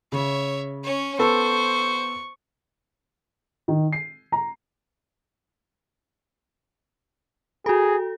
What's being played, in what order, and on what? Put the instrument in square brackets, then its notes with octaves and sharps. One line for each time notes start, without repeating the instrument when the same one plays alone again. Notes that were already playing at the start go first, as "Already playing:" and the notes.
[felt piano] C#3 [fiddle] C#5 E5
[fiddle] C#4 C#5
[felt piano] B3 A4 B4 [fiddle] C5 [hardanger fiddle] C#6
[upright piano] D#3
C7
A#5
[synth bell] F#4 A4 [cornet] G#4